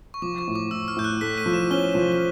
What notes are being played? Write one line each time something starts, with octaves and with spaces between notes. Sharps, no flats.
C#6
F3 D6
C#6
A2
D6
A2 E6
F6
A2 G6
F#6
A3 B6
D#7
F3
E7
C#4 G7
F3
G7